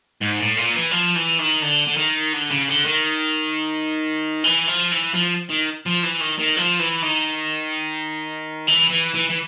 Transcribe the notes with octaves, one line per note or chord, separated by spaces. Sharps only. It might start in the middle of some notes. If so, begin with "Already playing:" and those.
G#2
A2
A#2
E3
F3
E3
D#3
D3
D3
D#3
D3
C#3
D3
D#3
E3
F3
E3
F3
D#3
F3
E3
D#3
D#3
F3
E3
D#3
E3
E3
E3
E3